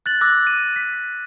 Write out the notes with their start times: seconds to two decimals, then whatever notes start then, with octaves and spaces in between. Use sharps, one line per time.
0.06 F#6 A6 F#7
0.21 D6 E6 F#6 A#6
0.47 D#7
0.76 B6